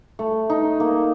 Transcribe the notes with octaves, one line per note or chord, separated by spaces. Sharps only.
A3
D#4
A#3